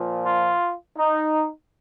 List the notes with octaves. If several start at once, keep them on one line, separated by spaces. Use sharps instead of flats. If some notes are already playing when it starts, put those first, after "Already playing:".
Already playing: A#2 F3
F4
D#4